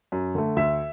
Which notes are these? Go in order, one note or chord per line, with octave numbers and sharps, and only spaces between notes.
F#2
D3 A3
D2 E5